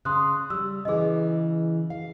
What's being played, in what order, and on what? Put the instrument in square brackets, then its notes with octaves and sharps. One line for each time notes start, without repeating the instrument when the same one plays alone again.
[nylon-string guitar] C#3 [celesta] C6 D#6 F#6
[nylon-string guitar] G3 [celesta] E6
[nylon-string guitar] C#3 E3 [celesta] G#4 D#5
[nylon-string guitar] F5